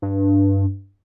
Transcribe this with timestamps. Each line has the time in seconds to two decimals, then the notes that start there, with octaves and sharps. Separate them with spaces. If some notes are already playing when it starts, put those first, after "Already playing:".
0.02 G2